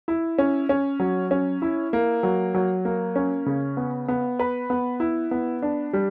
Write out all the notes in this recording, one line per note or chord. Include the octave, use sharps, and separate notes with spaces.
E4
C#4
C#4
F#3
C#4
E4
A#3
F#3
F#3
A#3
C#4
C#3
B3
B3
B4
B3
E4
B3
D4
G3